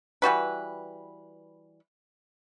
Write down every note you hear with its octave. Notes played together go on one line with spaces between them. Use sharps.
E3 G3 F#4 B4